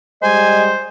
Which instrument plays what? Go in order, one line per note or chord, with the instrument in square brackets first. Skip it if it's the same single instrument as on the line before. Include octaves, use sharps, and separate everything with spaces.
[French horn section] G3 G#3 D#5 [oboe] C5 [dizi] G#5